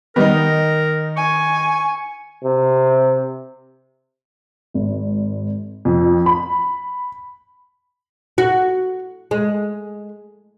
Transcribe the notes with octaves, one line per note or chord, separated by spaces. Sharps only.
D#3 G3 B3 D#4 A#4
G#5 C#6
C3
G#1
F2
B5
F#4
G#3